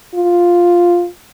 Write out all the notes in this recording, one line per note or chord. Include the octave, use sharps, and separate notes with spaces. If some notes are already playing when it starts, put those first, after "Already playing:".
F4